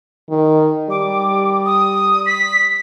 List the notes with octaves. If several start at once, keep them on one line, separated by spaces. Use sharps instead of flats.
D#3
G3 D6
D#6
B6